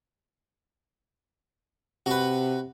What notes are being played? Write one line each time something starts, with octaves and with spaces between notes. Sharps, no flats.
C3 F#4 B4